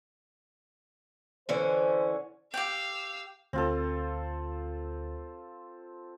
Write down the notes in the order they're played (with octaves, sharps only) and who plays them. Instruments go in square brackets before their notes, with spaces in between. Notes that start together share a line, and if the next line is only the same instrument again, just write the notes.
[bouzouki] D3 E3 C#4 [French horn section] C5
[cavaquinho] G4 G5 [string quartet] F5 E6
[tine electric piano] D2 [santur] C4 F4 A4